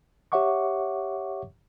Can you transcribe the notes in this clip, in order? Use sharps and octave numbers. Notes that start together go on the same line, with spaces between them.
G4 C#5 E5 F#5 C#6 D6